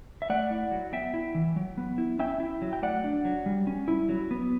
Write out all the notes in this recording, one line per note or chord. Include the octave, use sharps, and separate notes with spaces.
E5
A3 D5 F#5
E4
F#3
B3 E5 G5
E4
E3
F#3
B3
E4
C#4 E5 G5
E4
F#3
G5
A3 D5 F#5
D4
F#3
G3
C#4
E4
F#3
B3